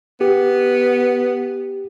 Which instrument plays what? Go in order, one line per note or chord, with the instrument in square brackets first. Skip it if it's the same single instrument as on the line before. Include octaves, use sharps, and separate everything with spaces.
[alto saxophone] B3 [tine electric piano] G4